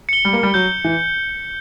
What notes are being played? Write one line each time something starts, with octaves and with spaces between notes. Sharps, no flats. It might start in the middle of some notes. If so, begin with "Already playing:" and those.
C#7 G7
G3
A#3
G3
F#3 G6
E3